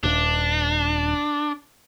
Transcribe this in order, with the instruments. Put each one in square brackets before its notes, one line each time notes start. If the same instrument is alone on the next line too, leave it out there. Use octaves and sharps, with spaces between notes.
[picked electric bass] D#1 [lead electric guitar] D4